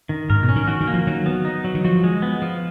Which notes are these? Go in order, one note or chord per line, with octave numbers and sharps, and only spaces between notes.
D#3
G#2 A#4
B2
C#4
D#3
D#3 F#4
D#3
A#3
F3
D#3 F#3
B3
D#4
F#3
D#3
F3 F#4
G#3
B3
F3